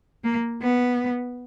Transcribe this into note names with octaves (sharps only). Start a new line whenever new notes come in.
A#3
B3